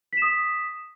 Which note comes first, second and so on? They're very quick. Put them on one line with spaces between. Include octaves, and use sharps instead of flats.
B6 E7 D#6